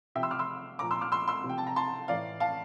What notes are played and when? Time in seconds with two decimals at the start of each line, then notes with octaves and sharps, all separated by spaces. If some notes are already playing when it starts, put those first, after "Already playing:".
0.15 C3 F3 E5 G5
0.23 C6 E6
0.31 D6 F6
0.39 C6 E6
0.79 A#2 F3 A#5 D6
0.91 C6 E6
1.01 D6 F6
1.12 C6 E6
1.28 C6 E6
1.44 C3
1.49 F3 G5
1.58 A5
1.67 A#5
1.76 A5 C6
2.08 A2 E3 D5 F5
2.40 F5 A5